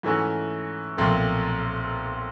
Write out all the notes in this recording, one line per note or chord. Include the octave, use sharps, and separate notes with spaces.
G#2 E3 A3 C#4 F#4
B1 A#2 F3 A3 C4